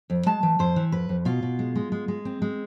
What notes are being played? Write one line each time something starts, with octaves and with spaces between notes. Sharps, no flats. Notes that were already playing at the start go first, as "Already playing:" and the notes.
F2
G#3 A5
E3
F2 C5
E3
F2 B4
F2
B2 F4
B2
G#3
G#3
G#3
G#3
C4
G#3